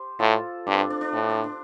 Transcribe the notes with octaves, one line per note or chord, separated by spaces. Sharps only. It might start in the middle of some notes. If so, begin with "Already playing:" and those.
Already playing: G4 C5
A2 F4 A4
G2 D4
C4
D4
D4
D4
A2
D4
D4